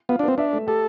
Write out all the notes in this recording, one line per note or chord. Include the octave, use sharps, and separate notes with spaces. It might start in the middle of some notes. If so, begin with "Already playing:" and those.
B3 F4
D4
B3 C4
D4 E5
A3
G4 A4